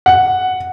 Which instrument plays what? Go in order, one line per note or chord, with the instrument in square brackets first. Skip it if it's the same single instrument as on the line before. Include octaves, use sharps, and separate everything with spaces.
[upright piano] F#5